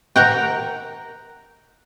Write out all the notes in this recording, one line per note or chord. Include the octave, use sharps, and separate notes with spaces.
A#4 F#5 G5